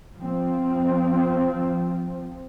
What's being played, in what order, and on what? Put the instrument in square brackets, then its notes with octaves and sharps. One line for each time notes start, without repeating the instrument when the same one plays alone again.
[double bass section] F3 C4